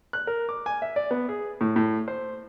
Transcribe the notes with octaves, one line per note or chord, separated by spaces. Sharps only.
F#6
A#4
D6
G#5
E5
D5
B3
G#4
A2
A2
C5